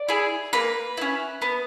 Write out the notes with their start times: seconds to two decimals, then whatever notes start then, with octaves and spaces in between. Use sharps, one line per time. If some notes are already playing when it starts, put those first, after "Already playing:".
Already playing: D5
0.09 E4 G#4
0.53 A#3 B4
0.97 C#4 E4
1.42 B3